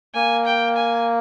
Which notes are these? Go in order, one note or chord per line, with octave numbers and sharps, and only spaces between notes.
A#3 G#5
G5
G#5